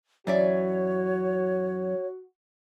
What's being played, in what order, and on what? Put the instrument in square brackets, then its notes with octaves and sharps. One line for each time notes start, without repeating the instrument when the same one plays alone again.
[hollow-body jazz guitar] F#2 [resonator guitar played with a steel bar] E3 D5 E5 [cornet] F#4 [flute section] C#5